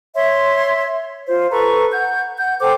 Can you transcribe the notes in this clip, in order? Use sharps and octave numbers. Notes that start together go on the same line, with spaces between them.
C#5 E5 C6
F4 C5
A4 B4 A#5 C#6
F#5 G6
F#5 G6
A4 C5 G5 D6